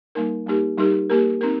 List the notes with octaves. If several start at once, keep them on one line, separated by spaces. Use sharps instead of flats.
G3 A#3 D#4 A#4
G3 A#3 D#4 G4 A#4
G3 D#4 G4 A#4
A#3 G4 A#4
C4 D#4 A#4